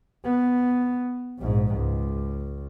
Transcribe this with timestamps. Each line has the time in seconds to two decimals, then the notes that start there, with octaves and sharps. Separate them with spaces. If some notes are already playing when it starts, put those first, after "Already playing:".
0.24 B3
1.39 A#1 G#2
1.75 C#2